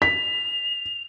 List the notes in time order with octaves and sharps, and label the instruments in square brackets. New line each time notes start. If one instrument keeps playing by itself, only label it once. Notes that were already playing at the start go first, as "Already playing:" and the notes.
[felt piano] B6 [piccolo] F7